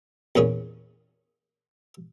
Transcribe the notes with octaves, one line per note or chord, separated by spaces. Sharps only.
E2 A#2 C#4 G#4